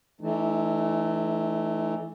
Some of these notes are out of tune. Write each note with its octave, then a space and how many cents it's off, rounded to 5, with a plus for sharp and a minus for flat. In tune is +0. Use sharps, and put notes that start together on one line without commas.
E3 +0 A3 -20 D#4 -40